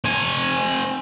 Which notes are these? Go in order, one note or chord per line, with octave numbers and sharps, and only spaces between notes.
C4 G#5